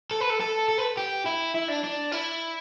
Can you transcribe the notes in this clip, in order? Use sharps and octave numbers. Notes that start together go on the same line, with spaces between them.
A4
B4
A4
A4
A4
B4
G4
E4
E4
D4
D4
E4